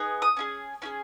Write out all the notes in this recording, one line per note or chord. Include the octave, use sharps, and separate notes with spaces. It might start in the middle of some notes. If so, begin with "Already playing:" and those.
Already playing: B3 D#4 G#4
D#6
C#4 E4 G#4
C#4 E4 G#4